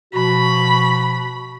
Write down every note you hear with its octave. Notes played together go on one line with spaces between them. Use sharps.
B2 F3 F#4 B5